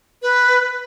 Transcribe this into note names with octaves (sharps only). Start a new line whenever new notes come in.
B4